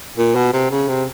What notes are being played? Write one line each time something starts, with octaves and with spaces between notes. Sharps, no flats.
A#2
B2
C3
C#3
C3